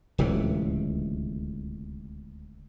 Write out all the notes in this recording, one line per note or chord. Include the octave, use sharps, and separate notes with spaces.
D1 C#2 C3 E3